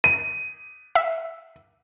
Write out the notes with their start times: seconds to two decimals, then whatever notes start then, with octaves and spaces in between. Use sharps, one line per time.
0.04 D#7
0.95 E5